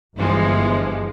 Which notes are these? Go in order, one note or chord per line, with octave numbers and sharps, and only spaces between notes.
G1 E3 F3 G#3